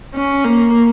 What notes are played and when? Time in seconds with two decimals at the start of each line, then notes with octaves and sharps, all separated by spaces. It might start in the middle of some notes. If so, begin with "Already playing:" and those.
0.14 C#4
0.44 A#3